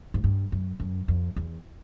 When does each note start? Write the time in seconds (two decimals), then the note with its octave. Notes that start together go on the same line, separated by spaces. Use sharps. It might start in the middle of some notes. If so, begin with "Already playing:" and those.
0.14 G#2
0.24 G2
0.52 F#2
0.80 F#2
1.08 F2
1.36 E2